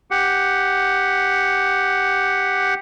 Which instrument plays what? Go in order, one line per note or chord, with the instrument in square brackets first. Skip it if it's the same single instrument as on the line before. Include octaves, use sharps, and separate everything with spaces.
[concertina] G4 F#5